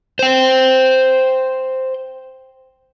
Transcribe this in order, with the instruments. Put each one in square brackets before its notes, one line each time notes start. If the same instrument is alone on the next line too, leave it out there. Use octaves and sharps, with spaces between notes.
[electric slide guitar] C5 G5